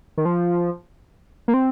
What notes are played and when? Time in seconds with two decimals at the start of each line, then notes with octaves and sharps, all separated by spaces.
0.17 D#3
0.25 F3
1.48 A#3
1.54 C4